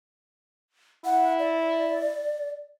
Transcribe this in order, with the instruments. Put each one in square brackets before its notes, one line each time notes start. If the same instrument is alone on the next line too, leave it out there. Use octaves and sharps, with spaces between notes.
[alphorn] E4 [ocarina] F#5
[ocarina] D5